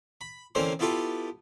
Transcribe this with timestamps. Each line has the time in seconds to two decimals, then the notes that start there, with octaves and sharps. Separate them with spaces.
0.21 B5
0.55 D3 E3 A#3 C4 C#4 C5
0.79 B3 E4 F4 G4 A4 B4